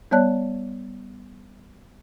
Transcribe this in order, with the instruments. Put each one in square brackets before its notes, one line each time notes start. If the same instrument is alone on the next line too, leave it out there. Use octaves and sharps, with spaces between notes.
[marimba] G3 B3 C#5 D5 A5 F#6